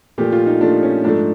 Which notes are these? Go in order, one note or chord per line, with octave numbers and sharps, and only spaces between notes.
A#2 F3 A3 G4
F4
D#4
A#2 F3 A3 D4
C#4
G#2 F3 A3 D4